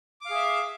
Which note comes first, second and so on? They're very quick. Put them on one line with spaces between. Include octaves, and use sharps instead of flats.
D6 F5 G#4 E5